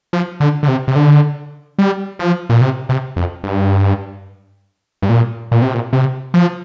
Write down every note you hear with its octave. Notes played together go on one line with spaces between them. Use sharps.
F3
D3
D3
C3
C3
D3
G3
F3
A#2
C3
C3
F2
G2
G2
A#2
A#2
C3
A#2
C3
F3